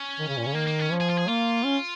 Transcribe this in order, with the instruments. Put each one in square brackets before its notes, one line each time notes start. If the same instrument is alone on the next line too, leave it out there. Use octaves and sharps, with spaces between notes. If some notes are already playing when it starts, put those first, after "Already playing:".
Already playing: [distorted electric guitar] C#4
[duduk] D#3
C#3
A#2
C#3
[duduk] D#3 [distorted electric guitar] A#3
[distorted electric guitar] A#3
C#4
[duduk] F3
[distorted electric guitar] G#4
F4
G#4
[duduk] A#3 [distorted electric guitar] F4
[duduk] C#4